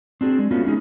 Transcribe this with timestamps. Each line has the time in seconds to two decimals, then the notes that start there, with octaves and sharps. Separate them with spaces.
0.21 C4 D4 F#4 G#4
0.39 G#3
0.51 A3 B3 C#4 F4 F#4
0.65 G#3 C#4 D#4 G#4